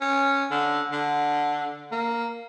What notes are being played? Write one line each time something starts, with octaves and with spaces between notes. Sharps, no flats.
C#4
D3
D3
A#3